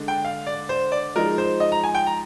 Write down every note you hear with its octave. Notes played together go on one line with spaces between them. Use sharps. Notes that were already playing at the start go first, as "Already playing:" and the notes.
Already playing: D3 G#3 D4
G5
F5
D5
C5
D5
F3 G#3 D#4 A#4
C5
D#5
A#5
G#5
G5
A#5